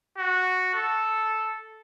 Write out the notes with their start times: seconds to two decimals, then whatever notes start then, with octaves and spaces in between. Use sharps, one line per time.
0.18 F#4
0.75 A4